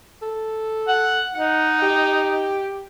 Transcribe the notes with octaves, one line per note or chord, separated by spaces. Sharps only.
A4
F#5
D#4 F#5
G4